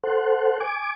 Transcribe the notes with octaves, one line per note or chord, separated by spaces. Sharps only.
A4 C5 F#5
G#5 D6